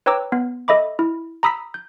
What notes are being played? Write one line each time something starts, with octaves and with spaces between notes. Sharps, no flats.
B4 C#5 G5 A#5 D6 E6
B3
A4 D#5 E5 B5 D6
E4
A#5 B5 D#6 E6 B6
G6